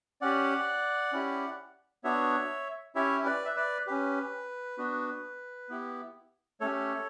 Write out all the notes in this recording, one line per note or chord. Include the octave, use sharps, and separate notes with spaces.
C#4 G4 D5 F#5
C#4 E4 G4
B3 D4 F#4 C#5 E5
C#4 E4 G4 C#5 E5
B4 D5
E5
B4 D5
C#4 G4 B4
B3 D4 F#4
B3 E4 G4
A3 C#4 G4 A4 C#5